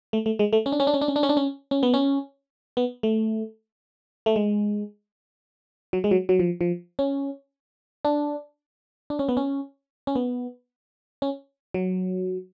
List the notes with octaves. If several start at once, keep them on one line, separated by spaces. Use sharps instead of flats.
A3
A3
G#3
A3
C#4
D4
C#4
D4
C#4
D4
C#4
D4
C#4
D4
C#4
C#4
B3
C#4
B3
A3
A3
G#3
F#3
G#3
F#3
F#3
F3
F3
C#4
D4
D4
C#4
B3
C#4
C#4
B3
C#4
F#3